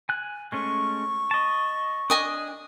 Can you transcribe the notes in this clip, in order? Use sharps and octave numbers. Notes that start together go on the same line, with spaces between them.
G#5 F#6
G#3 A3 C#4 C#6
D#5 A5
D4 D#5 G#5 D#6